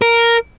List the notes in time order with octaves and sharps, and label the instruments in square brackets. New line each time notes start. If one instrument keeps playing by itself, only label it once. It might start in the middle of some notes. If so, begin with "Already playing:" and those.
[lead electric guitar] A#4